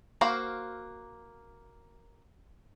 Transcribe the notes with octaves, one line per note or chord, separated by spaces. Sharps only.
A#3 F#4 C5 F5